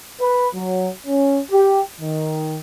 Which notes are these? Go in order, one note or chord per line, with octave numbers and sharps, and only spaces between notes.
B4
F#3
C#4
G4
D#3